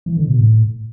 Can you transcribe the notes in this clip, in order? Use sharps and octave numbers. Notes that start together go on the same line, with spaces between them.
E3
D3
B2
A2